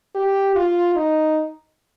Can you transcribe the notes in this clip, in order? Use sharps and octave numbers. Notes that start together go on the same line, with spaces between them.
G4
F4
D#4